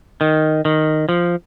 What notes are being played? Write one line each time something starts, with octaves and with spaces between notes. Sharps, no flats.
D#3
D#3
F3